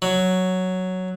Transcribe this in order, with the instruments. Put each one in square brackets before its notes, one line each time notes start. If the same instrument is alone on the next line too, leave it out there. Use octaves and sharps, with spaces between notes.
[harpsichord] F#3